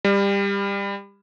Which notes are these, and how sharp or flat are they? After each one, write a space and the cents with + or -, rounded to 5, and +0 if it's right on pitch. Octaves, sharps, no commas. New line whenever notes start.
G3 +25